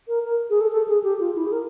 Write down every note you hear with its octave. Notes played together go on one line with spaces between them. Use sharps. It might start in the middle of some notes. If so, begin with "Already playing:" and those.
A#4
A#4
G#4
A4
A4
G#4
G4
F4
E4
G#4
A#4